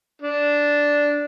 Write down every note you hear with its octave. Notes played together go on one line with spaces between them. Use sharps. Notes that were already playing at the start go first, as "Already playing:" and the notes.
D4